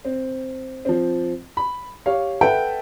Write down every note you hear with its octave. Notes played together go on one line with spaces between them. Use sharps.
C4
F3 C4
B5
G4 C#5 F5
A4 B4 E5 F#5 G5